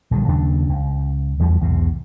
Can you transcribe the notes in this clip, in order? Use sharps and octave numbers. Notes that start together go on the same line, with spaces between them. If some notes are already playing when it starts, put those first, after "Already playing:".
A#1 D3 D#3 G3
D#2 C#3 F#3 D4
C#2
E2 F3 G3
B1 E2 G#2 C3